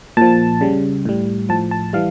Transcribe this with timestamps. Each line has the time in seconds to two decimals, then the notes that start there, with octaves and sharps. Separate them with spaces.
0.17 A#2 F3 A5
0.61 C#3 G3
1.05 A2 G3
1.49 A2 F3 A5
1.71 A5
1.93 E3 G3 F5